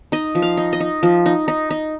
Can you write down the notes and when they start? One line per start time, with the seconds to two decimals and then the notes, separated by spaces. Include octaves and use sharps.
0.12 D#4 D#5
0.35 F3
0.42 F5
0.57 D#4
0.73 D#5
0.80 D#4
1.03 F3
1.26 D#4
1.48 D#4
1.71 D#4